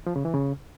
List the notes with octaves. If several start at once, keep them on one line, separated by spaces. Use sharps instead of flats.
F3
C#3
E3
C#3